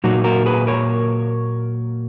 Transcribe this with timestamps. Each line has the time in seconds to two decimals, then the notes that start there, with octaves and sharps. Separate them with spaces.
0.04 A#2 F#3 A#3 D#4 F#4
0.24 F#4 A#4
0.46 G#4 B4
0.67 A#4 C#5